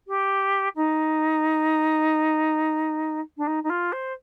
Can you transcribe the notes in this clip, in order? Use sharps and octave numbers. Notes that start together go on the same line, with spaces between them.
G4
D#4
D4
D#4
D#4
F4
C5